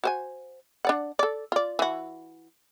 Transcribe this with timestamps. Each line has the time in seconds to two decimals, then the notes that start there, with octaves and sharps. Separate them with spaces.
0.04 F#4 C5 G#5
0.85 D4 D5 F#5
1.19 A4 D5
1.52 F4 D5
1.79 E3 F#4